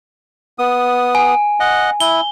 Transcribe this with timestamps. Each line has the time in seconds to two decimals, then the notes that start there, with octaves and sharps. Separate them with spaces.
0.59 B3 D#6
1.15 G#5
1.60 D#5 F#5
2.00 E4 G7